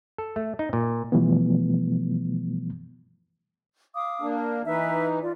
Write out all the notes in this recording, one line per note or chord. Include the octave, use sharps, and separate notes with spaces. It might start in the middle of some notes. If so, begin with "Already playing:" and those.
A4
A3
D#4
A#2
B2 E3 F3 G3 A3 B3
F5 D6 D#6
A#3 D4
A#4
E3 D#4 B4 E5
F4 D5